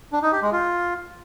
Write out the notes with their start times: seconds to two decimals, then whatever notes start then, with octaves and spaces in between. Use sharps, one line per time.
0.13 D4
0.22 D#4
0.32 G4
0.42 G#3
0.52 F4